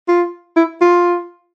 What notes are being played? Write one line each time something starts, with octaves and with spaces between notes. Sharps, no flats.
F4
E4
F4